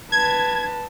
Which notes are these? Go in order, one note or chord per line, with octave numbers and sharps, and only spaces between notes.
B4 A5 G#6